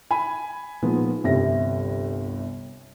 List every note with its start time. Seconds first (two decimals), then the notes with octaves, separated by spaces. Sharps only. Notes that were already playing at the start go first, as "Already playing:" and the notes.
0.11 G#5 B5
0.82 A#2 F3 G#3 B3 D#4
1.24 G1 C2 C3 G4 A#6